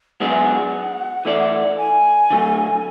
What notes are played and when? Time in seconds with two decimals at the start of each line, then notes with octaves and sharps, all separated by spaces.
0.20 G#2 F#3 B3 D4 G#4 F#5
0.30 E5
0.40 F#5
1.25 E3 A3 E4 A4 D5
1.78 G#5
2.30 D3 F#3 A3